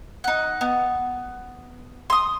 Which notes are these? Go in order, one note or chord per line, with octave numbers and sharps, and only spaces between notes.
D#4 F#5
B3
C6 D#6